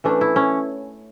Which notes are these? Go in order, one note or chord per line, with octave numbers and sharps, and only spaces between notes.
E3 A3 C#4 D4
E4
C#4